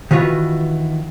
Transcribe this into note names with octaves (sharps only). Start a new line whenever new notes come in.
D#3 E3 F4 F#4 B4